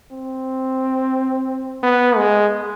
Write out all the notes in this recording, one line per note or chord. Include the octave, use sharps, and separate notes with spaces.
C4
B3
G#3